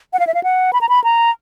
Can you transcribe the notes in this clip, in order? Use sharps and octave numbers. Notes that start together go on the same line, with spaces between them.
F#5
F5
E5
F5
F#5
B5
A#5
B5
A#5